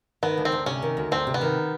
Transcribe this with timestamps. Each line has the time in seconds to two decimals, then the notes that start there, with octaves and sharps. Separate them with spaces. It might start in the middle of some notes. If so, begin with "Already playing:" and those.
0.23 D#3 B3
0.37 D2
0.45 C4
0.52 D2
0.66 C3 C#4
0.82 D#3
0.97 D2
1.11 D2 C4
1.27 C3
1.34 B3
1.41 D#3